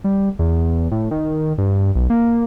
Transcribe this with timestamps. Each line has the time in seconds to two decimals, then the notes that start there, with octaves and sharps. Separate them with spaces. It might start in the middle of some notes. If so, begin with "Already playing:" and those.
0.04 G3
0.39 E2
0.92 A2
1.11 D#3
1.58 G2
1.95 B1
2.10 A#3